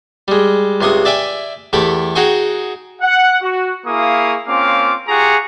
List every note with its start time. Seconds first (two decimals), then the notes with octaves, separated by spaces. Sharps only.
0.28 G3 G#3
0.81 C#2 C3 C6 C#6 D#6
1.05 D5 E5 G5 G#5
1.73 E2 A3 G4 G5 B5 C#6
2.15 D#4 F#4 G#4 G5 G#5 C#6
3.01 F#5
3.41 F#4
3.86 A#3 E4 G#4 F5 C#6 D#6
4.47 A#3 C4 C#4 F4 F5 D6
5.08 F4 G4 G#4 F#5 A#5 C#6